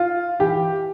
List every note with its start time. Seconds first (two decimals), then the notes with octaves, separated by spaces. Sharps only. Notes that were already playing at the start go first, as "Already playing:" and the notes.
Already playing: F4
0.40 E3 G4